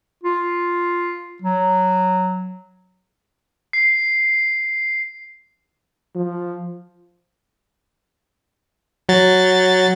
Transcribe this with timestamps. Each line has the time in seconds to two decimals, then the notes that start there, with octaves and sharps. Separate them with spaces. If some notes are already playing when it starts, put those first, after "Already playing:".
0.24 F4
1.42 F#3
3.73 C7
6.16 F3
9.09 F#3 A6